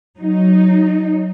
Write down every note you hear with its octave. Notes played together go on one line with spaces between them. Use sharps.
F#3 D#4